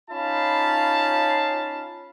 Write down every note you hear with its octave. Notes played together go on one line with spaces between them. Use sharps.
C#4 D#4 F4 F5 A5 B5